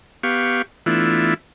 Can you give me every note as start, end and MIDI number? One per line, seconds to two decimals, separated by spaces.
0.23 0.62 59
0.23 0.62 67
0.23 0.62 77
0.23 0.62 85
0.86 1.34 52
0.86 1.34 57
0.86 1.34 59
0.86 1.34 62
0.86 1.34 64
0.86 1.34 65